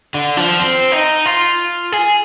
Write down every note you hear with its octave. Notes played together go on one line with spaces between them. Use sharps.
D3
F3
C4
D#4
F4
G#4